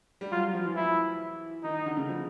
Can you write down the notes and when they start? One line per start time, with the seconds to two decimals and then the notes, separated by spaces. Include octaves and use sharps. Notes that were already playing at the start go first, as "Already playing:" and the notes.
0.21 G3
0.32 F#3 F4
0.43 F#3
0.53 F3
0.65 E3
0.76 E4
1.64 D#3 D#4
1.86 D3
1.97 C#3
2.08 F3